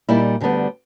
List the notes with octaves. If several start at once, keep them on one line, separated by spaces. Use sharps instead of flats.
A#2 G3 A#3 D#4 E4
D2 D3 G3 B3 D4